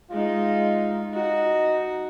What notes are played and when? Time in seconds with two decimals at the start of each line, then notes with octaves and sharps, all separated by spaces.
0.11 G#3 D#4 F4
1.13 D#4 F#4